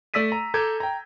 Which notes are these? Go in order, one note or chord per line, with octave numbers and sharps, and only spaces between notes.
A3 D5 E6 A6 B6 D#7
A#5
A4 A#5 D6 G6 G#6
G5 A#5